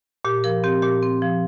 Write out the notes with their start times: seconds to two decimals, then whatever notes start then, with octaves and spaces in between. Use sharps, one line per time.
0.25 A#2 G4
0.44 F3 A#4
0.64 C4 G4
0.82 A#2 G4
1.02 C4
1.22 F3